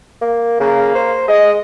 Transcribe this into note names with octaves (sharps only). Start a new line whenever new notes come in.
A#3
C#3 A#3
C5
G#3 D#5